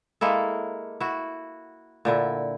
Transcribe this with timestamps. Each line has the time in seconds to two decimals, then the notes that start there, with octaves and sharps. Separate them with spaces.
0.21 G#3 A#3 E4 A4
1.00 E4 F#4
2.05 A#2 D3 E4